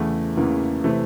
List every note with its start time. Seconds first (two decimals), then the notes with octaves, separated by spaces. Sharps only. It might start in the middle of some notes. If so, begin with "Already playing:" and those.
Already playing: E2 C#3 E3 A3
0.37 E2 C#3 E3 A#3
0.84 C3 E3 A3